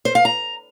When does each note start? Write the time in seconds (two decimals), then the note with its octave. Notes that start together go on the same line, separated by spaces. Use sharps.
0.05 C5
0.15 F5
0.25 A#5